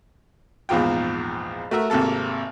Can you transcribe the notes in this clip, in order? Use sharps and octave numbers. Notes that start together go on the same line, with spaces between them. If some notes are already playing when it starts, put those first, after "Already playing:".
A#1 E2 G#2 F4 G5
A3 F#4 A#4 E5
G#1 C3 A#3 A4 A5